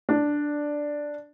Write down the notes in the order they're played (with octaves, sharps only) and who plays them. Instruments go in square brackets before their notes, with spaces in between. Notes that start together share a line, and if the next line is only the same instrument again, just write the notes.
[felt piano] D4